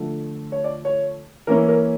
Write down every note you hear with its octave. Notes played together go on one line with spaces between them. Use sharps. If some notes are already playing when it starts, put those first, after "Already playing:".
Already playing: D3 F3 A3
C#5
D5
C#5
E3 A#3 C#4 E4 A#4
A#4